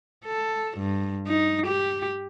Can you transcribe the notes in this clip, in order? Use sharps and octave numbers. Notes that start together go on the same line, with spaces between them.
A4
G2
D#4
G4